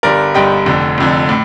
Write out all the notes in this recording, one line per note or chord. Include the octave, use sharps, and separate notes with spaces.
G1 G2 D3 G3 A#4 D5
G1 G2 D3 G3 D#5 G5
F1 F2 D3
F1 F2 D3
A2